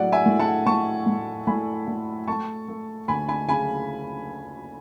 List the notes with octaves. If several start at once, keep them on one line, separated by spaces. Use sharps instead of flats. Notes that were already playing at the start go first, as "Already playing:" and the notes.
Already playing: A2 F#3 A3 D5 F#5
E5 G#5
A2
F#5 A5
A2 A5 C#6
A2
A2 G#5 B5
A2
A3 A5 C#6
A3
D2 G#5 B5
G#5 B5
C#3 G#5 B5